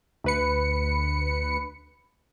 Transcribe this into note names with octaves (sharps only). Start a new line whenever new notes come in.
D2 B4 C#7